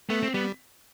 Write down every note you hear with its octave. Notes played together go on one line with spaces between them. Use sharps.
A3 B3
C4
G3 B3